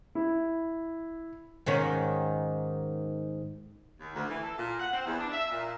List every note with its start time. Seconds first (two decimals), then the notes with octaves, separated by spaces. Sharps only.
0.15 E4
1.66 G#2 D#3 C#4
4.01 D#2
4.15 D2
4.29 E3
4.44 A4
4.59 A#2
4.80 F#5
4.94 C4
5.06 E2
5.19 D4
5.32 E5
5.51 A#2